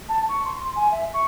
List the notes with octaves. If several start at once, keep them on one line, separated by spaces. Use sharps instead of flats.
A5
C#6
C6
C6
G#5
E5
C#6